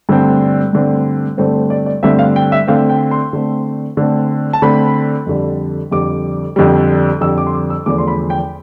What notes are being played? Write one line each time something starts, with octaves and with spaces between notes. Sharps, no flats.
G2 D3 A3 C4
G2 D3 A3 C4
G2 D3 A3 C4 C5
C5
D5
D5
G2 D3 A3 C4 E5
F5
G5
E5
D3 A3 C4 F5
G5
C6
D3 A3 C4
D3 A3 C4
A5
D3 A3 C4 B5
F2 D3 G3
F2 D3 G3 D6
F2 D3 G3
F2 D3 G3 E6
D6
C6
D6
E6
E2 D3 F3 A3 D6
C6
B5
G5